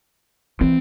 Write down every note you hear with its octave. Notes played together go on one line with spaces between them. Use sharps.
E3 C4